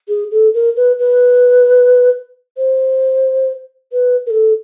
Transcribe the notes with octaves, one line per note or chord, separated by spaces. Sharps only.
G#4
A4
A#4
B4
B4
C5
B4
A#4
A4